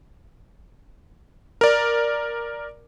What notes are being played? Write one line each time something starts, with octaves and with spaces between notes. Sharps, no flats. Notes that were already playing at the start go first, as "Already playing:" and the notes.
A#4 D5